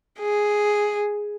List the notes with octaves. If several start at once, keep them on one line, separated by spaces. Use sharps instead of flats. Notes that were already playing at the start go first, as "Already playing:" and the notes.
G#4